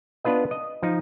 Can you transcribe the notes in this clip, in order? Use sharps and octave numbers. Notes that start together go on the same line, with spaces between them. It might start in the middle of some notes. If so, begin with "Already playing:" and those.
B3 D4 F4 B4 D#5
D#5
F3 D#4